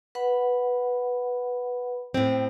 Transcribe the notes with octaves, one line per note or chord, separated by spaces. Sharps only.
B4 F#5 B5
A2 C4